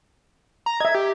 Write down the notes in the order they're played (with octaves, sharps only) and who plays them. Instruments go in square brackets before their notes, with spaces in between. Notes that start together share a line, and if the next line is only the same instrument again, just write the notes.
[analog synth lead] A#5
[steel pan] D#5 E5 [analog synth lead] G#6
[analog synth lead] G4